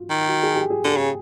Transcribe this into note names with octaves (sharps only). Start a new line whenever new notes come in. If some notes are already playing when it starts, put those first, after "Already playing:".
Already playing: F4 F#4
D#3
F#4
G#4
G4
G#4
D3 G4
C#3